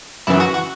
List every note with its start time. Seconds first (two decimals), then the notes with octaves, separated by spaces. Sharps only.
0.27 F#2 C#3 E3 E4
0.40 F#4
0.54 F#4